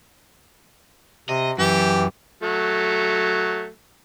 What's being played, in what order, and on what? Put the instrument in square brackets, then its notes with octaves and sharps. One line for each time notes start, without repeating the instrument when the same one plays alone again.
[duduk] C3 [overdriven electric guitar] D#5
[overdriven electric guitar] F#2 [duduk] E3 [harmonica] G4
[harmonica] F#3 A3